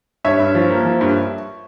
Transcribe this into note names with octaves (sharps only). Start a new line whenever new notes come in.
G2 C#5 E5
G2
F3
A#3
F3
G2